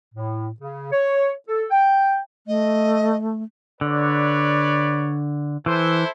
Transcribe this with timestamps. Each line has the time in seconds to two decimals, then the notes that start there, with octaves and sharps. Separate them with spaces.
0.15 A2
0.61 C#3
0.92 C#5
1.48 A4
1.71 G5
2.47 A3 D#5
3.81 D3 B4 C#5 D5
5.66 E3 E4 A4 C5